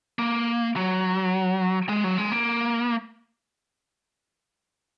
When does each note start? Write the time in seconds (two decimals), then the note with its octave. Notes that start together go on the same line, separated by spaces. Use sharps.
0.19 A#3
0.76 F#3
1.89 G#3
2.04 F#3
2.18 G#3
2.32 A#3